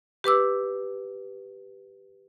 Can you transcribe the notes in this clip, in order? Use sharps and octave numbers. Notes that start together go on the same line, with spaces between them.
G4 B4 D6 E6